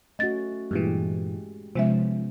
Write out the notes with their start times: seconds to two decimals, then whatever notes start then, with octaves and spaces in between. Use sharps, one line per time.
0.19 A3 C#4 F#4 D#5 A6
0.71 G2 A#2 E3 G#3 G4 G#4
1.76 C3 F3 G#3 B3 C#4 E5